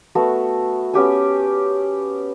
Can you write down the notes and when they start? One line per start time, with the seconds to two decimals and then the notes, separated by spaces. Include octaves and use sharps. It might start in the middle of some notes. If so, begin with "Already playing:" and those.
0.15 A3 B3 F#4
0.94 B3 C#4 G4 G#5